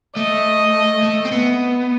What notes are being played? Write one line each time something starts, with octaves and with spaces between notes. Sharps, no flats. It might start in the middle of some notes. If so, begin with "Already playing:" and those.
A3 D#5
A3
C4
B3